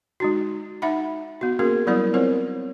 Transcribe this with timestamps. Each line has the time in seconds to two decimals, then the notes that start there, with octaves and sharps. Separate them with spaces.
0.20 G#3 D#4 F#4
0.82 D#4 E5 F#5 B5
1.41 B3 F#4
1.59 A#3 C#4 F#4 G#4 A#4
1.87 F#3 G3 B3 E4 A#4 D5
2.14 C4 F4 A#4 C5 C#5